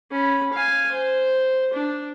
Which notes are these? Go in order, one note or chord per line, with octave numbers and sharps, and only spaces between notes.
C#4 B5
F5 G#5
C5
D4